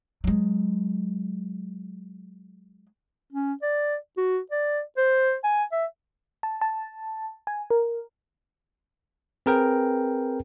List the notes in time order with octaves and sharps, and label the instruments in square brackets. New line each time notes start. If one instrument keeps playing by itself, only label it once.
[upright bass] F#3 G#3
[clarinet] C#4
D5
F#4
D5
C5
G#5
E5
[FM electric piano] A5
A5
G#5
A#4
[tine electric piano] C4 G#4 A#4 B4 G5